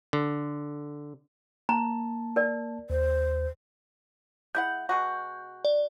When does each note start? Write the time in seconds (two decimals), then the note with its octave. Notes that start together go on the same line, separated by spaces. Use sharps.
0.13 D3
1.69 A#3 A5 A#5
2.36 A#4 D5
2.90 D#2 C5
4.55 G#3 E4 F#5 G6
4.89 B2 G#3 F#4
5.65 D5